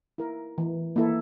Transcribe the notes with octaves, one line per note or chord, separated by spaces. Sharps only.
E4 A#4
E3
A#3 E4 A4